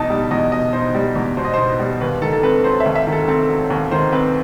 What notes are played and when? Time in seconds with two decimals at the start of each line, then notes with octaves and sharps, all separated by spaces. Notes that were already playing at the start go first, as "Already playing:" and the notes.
Already playing: E2 B2 D#4 A5 D#6
0.10 G3
0.31 E2 D#5
0.52 B2 D#5
0.73 D#4 C5
0.95 G3
1.16 E2
1.37 B2 C5
1.45 D#5
1.54 D#4 C5
1.79 G3
2.01 D#2 B4
2.22 D#3 A4
2.33 A4
2.43 C4 B4
2.64 F#3 C5
2.80 E5
2.85 D#2
2.95 E5
3.07 D#3
3.12 A4
3.28 C4 A4
3.49 F#3
3.70 D#2
3.91 D#3 C5
4.12 C4 B4